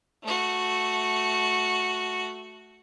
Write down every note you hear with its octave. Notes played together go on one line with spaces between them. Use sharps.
A3 F#4